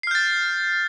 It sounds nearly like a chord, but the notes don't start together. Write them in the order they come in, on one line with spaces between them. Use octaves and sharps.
C7 F6 G6 A6